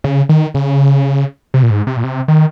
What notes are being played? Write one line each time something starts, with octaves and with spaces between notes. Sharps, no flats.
C#3
D#3
C#3
C3
A#2
G#2
C3
A#2
C3
D#3